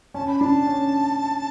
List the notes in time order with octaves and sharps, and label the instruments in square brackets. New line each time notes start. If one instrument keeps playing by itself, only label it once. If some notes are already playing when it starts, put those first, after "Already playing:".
[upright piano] C#4 [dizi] A5
[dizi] B5
[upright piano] D4 [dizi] A5
[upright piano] C#4